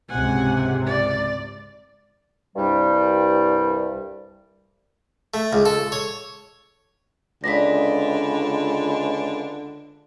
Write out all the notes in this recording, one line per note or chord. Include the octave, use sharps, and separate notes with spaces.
C#2 G#2 C3 F#5 G#5
D5
C2 G2 G3
A3
C#2
A4
C#5
C#2 D3 D5 D#5 A#6 B6